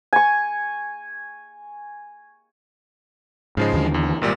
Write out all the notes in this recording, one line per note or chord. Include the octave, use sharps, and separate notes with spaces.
G#5 C#6
G#2 C#3 F3 G#3
D#2 D3 E3
E2
G#1 A#2 G3